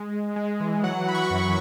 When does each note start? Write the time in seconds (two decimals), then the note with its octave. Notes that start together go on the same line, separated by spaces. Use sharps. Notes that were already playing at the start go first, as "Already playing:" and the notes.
Already playing: G#3
0.12 G#3
0.36 G#3
0.60 E3
0.83 F#3 F#5
1.07 F#3 B5
1.14 C#6
1.30 F#2